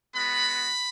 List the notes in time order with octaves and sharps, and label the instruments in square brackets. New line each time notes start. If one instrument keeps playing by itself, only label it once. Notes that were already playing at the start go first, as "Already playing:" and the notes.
[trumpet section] G#3 B3 F#4 B5